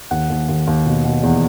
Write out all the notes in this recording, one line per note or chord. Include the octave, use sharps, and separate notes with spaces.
D#2 F#5
D#2
D#2
D#2
B2
B2
E2